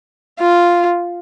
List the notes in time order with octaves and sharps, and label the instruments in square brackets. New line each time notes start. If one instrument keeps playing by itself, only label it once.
[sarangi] F4